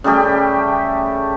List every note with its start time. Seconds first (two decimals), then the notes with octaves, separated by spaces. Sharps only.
0.04 C#3 G3 A3 G4